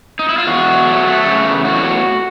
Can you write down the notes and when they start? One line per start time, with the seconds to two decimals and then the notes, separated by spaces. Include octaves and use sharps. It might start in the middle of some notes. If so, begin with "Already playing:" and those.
0.19 D#4
0.29 E4
0.38 F4
0.47 E2 F#4
0.67 F#3
0.86 A3
1.06 A3
1.25 C#3
1.45 E2
1.65 A2 F#4